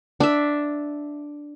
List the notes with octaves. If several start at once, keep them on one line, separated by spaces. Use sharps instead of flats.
D4 E5